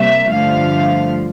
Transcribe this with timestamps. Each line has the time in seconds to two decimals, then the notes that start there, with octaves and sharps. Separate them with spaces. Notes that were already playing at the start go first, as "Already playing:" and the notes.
Already playing: C3 G3 A#3 E5
0.31 G2 D3 F3 A3 F5